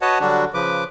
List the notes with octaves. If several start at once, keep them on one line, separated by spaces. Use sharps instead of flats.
F#4 B4 C#5 D#5 F#5 A5
D3 F#3 G3 D4 F#4
C#3 F3 B4 D6